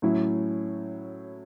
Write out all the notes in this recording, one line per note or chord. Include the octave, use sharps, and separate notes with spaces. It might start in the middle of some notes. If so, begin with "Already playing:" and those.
A2 F#3 C#4 E4